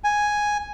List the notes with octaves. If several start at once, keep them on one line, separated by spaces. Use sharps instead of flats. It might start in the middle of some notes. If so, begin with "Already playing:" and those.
G#5